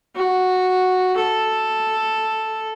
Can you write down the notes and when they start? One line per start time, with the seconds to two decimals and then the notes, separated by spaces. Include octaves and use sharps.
0.16 F#4
1.16 A4